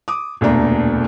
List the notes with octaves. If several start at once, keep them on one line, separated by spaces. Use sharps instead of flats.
D6 D#6
E1 D2 A#2 D4 A#5